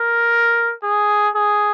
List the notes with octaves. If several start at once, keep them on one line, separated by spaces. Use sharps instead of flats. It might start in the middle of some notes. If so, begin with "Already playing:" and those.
Already playing: A#4
G#4
G#4